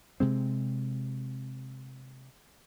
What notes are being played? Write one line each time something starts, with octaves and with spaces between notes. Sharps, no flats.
C3 G#3 C4